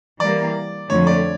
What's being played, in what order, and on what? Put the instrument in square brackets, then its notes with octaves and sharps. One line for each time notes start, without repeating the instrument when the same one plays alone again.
[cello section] E3 G3 A#3 [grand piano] D5
[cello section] F2 D3 F3 A3 [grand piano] C#5
[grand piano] D5